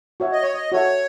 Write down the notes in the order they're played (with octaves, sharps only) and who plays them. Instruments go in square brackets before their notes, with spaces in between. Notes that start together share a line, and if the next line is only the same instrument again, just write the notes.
[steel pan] F#4 C#5 E5
[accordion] D#5
C#5
D#5
[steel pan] F#4 A4 E5 [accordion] C#5